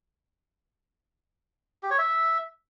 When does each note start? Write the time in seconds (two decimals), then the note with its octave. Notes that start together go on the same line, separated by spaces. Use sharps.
1.83 G4
1.91 C#5
1.98 E5